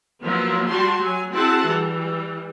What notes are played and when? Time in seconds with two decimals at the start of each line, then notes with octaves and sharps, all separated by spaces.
0.23 F3 F#3 A#3 B3 E4
0.70 G3 F#4 G4 A5 C6
1.03 F#3 G#5
1.33 C4 E4 F#4 G#4 F#5 A5
1.68 E3 G3